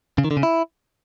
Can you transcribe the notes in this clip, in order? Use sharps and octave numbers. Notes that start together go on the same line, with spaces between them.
C#3
D#3
D3
C#3
E4